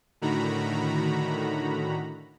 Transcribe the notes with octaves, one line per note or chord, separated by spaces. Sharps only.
A2 D3 D#3 F#4 A#5 B5